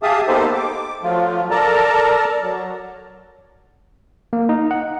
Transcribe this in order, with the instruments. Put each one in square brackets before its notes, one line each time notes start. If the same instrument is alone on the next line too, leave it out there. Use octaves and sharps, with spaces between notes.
[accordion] G4 G#4 E5 F5 A5 D#6
A#3 B3 D#4 G4 A4 C5
D6
F3 F#3 A3 F4
A4 A#4 D5 A5 A#5
F#3
[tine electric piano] A#3
D#4
F#5